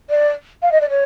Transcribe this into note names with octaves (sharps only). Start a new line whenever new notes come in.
D5
F5
D#5
D5
C#5